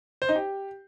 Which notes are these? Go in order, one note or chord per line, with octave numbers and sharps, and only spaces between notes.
C5
D#4
G4